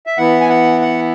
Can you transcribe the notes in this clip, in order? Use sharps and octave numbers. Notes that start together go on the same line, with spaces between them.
E5
E3 B3 E4 F#5
G#5
F#5
F#5